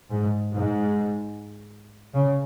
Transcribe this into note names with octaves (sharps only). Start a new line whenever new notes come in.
G#2
G#2
C#3